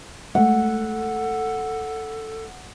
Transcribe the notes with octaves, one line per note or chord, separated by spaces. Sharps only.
G#3 A3 A4 F#5